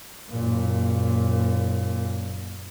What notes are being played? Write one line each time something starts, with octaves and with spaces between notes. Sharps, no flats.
F#1 A#2